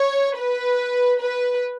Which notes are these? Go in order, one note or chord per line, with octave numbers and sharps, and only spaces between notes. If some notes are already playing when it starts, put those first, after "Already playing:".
Already playing: C#5
B4
B4